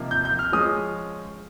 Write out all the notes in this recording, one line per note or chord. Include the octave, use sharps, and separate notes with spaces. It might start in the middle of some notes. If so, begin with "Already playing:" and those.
Already playing: C3 F3 A#3 D#4
G6
G6
F6
F3 G#3 C#4 D#6